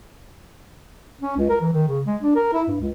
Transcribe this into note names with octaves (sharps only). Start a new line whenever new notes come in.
C#4
C#2
A#4
E3
D#3
C#3
G#3
D4
A#4
E4
G2
C#2